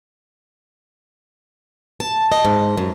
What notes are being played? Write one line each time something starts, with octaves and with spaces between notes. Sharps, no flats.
A5
D#5
G#2
F#2